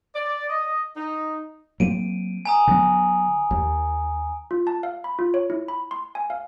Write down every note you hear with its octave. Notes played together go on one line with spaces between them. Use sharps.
D5
D#5
D#4
F#3 A#3 C4 D7 D#7
G#5 A#5 D#6
D3 F#3 B3
D#2
F4
A5
F5
B5
F4
C#5
E4
B5
C6
G#5
F5